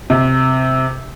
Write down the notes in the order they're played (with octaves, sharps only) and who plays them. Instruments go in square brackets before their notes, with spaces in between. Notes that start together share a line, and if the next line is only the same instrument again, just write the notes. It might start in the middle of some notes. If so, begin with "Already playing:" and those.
[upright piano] C3